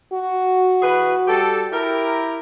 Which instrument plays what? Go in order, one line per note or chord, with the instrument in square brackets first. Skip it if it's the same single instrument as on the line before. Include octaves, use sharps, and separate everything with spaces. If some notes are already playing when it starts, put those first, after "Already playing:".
[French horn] F#4
[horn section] E3 G#4 B4
G3 G4 A4
E4 G4 A#4